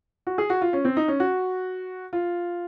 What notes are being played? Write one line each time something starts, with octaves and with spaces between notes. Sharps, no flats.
F#4
G#4
F#4
F4
C#4
C4
D#4
C#4
F#4
F4